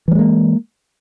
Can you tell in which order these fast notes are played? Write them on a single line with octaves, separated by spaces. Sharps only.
E3 G3 G#3 A#3